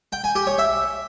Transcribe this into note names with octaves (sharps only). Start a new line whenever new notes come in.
G5
G#5
G4
C#5
E5